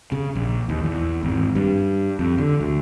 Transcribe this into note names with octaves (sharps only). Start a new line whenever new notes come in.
C#3
A#1
D#2
E2
G#1
G2
F2
D3
D2